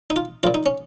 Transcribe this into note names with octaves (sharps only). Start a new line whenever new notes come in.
D#4
F4
A#1 A#2 F4
D#4
C#4